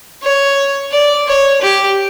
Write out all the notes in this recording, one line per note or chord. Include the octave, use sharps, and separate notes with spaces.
C#5
D5
C#5
G4